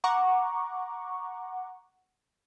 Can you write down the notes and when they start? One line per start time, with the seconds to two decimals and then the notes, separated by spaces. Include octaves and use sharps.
0.04 F#5 A#5 C#6 D6